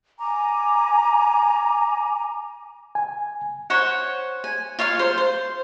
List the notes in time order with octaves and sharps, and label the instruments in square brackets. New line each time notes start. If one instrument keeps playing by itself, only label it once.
[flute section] G#5 A#5 D6
[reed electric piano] G#5
[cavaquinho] C5 C#5 F#5
G#5
F4 C#5 F5 C6
C5
C5